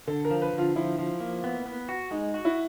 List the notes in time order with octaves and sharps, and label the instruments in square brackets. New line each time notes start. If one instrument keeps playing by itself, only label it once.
[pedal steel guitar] D3 [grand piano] A4
[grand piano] A#4
[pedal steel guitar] F3
[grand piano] B4
[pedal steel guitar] D3
[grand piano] F4
[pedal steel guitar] F3 [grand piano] E4
[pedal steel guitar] F3
A#3
B3
B3
F#4
[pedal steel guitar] G#3 [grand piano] D#4
[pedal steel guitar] F#4
[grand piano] E4